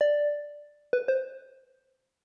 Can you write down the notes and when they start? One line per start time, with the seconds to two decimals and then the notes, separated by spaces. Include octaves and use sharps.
0.01 D5
0.93 B4
1.08 C5